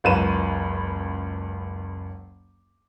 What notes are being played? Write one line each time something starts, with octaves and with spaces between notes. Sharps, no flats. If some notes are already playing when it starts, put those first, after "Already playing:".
F#1 C#2 B4 D#7 E7